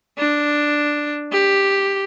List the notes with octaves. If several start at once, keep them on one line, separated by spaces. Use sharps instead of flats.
D4
G4